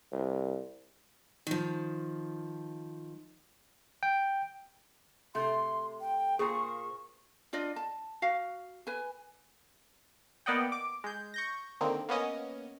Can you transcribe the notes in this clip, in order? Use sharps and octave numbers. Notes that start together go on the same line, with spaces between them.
C2
D#3 F3
G5
C3 A3 C6
G5
A#2 A#3 G#4 C5 C#6
D4 F4 D5 D#5
A5
F#4 F5
B4 G#5
A#3 B3 D5 D#5 F#5 G5
D6
G#3 G6
C#6 G6 A#6
D3 D#3 A#3 C4
A#3 B3 C#4 D#5